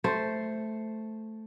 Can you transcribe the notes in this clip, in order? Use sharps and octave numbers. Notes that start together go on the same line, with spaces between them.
A3 C5